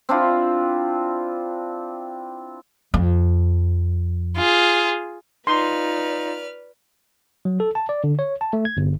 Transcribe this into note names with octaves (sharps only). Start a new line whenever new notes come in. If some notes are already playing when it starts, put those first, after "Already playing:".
C4 D4 E4 F4
F2
F4 G#4
D#4 F4 B4 D5 C6 F6
F#3
A4
A5
D5
D3
C#5
A5
A3
G#6
G1